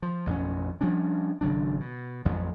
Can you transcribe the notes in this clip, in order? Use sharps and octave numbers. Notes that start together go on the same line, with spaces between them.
F3
A1 F2 B2 C#4
F3 G3 C#4 D4
G#1 C#3 F#3 D4
B2
A1 F2 F3 F#3